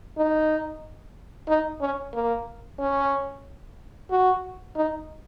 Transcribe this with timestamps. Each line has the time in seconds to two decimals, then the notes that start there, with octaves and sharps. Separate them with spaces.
0.18 D#4
1.48 D#4
1.81 C#4
2.14 A#3
2.79 C#4
4.11 F#4
4.76 D#4